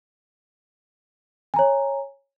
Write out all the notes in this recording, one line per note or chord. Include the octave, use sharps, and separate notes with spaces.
C#5 G#5 A#5